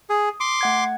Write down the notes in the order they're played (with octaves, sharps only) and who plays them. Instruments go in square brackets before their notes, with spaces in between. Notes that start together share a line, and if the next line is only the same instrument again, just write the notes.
[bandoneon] G#4 [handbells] D#6
[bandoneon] C6 D6
[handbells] A3 F#5 G#6